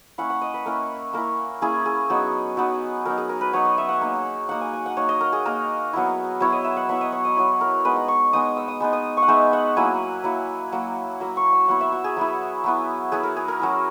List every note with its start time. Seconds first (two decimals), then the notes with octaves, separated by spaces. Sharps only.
0.18 A#3 C#4 E4 F#5
0.30 F#5
0.41 D#5
0.54 B4
0.66 A#3 C#4 E4 A#4
1.13 A#3 C#4 E4 A#4
1.62 A#3 C#4 E4 G#4
1.86 G#4
2.10 F#3 B3 D#4
2.57 F#3 B3 D#4
3.05 F#3 B3 D#4 A#4
3.18 G#4
3.29 A#4
3.41 B4
3.53 F#3 B3 D#4 C#5
3.65 D#5
3.78 E5
3.89 F#5
4.01 A#3 D#4
4.49 A#3 D#4 F#5
4.61 G#5
4.73 G#5
4.86 F#5
4.97 A#3 D#4 C#5
5.09 D#5
5.21 A#4
5.33 G#4
5.45 A#3 D#4 A#4
5.93 F#3 B3 E4
6.40 F#3 B3 E4 C#5
6.52 D#5
6.64 E5
6.76 F#5
6.89 F#3 B3 E4 E5
7.01 D#5
7.12 C#5
7.25 D#5
7.36 F#3 B3 E4 C#5
7.61 A#4
7.85 G#3 B3 D#4 B4
7.96 A#5
8.08 C#6
8.33 G#3 B3 D#4 D#6
8.57 E6
8.68 D#6
8.80 G#3 B3 D#4
8.93 D#6
9.17 C#6
9.22 F#5
9.28 G#3 B3 D#4 E5
9.53 F#5
9.77 F#3 A#3 E4 G#5
10.24 F#3 A#3 E4
10.72 F#3 A#3 E4
11.20 F#3 A#3 E4 A#5
11.37 C#6
11.53 E6
11.68 F#3 B3 E4 F#5
11.81 E5
11.92 F#4
12.04 G#4
12.17 F#3 B3 E4
12.64 F#3 B3 E4
13.12 F#3 B3 E4 G#4
13.23 A#4
13.37 G#4
13.48 A#4
13.59 F#3 C#4 E4